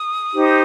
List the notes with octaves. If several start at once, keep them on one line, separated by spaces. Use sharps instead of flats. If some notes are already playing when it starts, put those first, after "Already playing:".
Already playing: D#6
D#4 G4 C5